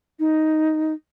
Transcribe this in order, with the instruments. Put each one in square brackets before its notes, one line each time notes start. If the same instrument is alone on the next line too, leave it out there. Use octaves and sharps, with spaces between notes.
[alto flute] D#4